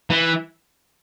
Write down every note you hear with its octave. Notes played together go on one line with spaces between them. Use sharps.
E3